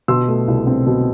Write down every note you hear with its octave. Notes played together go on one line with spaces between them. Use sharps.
B2 C6 E6
A3
C2
C4
B2